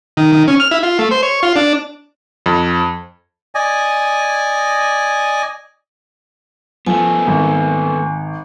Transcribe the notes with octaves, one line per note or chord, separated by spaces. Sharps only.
D#3
D#3
C#4
F6
E4
F4
A3
C5
C#5
F4
D4
F2
D5 D#5 G#5
F3 A3 B3 G#5
G#1